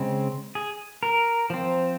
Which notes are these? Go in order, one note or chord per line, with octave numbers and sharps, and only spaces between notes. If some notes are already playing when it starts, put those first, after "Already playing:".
Already playing: C#3 G#3 C4
G#4
A#4
F3 C4